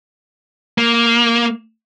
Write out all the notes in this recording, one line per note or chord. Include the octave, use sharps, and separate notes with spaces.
A#3